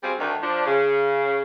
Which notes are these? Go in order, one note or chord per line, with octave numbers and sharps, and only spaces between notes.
G3 C4 F#4 G#4 C5 F5
D2 D#3 A3 D4
F3 D4
C#3